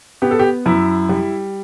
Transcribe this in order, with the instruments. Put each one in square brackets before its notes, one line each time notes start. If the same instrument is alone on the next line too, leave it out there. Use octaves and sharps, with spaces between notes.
[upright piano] B3 G4
A4
G4
F#2 E4
G3